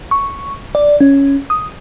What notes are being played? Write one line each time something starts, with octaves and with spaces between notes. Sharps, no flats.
C#6
D5
C#4
D#6